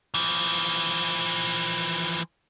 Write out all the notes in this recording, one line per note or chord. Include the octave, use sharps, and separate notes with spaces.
E3 F3